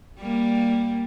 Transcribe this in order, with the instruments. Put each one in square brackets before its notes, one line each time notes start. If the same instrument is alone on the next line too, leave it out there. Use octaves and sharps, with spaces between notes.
[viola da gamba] G3 A#3